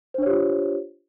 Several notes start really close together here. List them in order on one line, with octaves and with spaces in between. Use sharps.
C5 D4 C#5 G4 F4